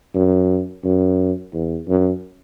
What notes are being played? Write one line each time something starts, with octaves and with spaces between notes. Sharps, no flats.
F#2
F#2
E2
F#2